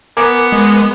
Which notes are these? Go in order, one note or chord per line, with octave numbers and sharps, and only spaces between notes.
B3 A#4 G#5 D6
G#3